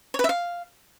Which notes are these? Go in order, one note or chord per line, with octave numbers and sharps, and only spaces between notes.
C#5
B4
E5
F5